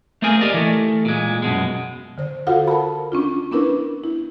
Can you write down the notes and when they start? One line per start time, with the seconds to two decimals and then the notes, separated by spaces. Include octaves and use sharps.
0.22 A3 A#3 C4 G#4 A#4 G#5
0.41 G4 A#4 D5 D#5
0.54 E3 A3
1.05 A#2 G#3
1.42 F#2 B2 G#3
2.18 D3 C5
2.47 F4 F#4 A4 C5 F5 F#5
2.68 A#4 A5 B5
3.12 C#4 D4 F4
3.51 B3 C#4 D4 E4 A#4 B4
4.04 E4